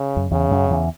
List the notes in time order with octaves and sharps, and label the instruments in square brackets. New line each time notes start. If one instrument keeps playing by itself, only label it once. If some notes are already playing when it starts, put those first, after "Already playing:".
Already playing: [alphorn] C#3
[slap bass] F#2
[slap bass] E2 [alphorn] C#3
[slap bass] F#2
E2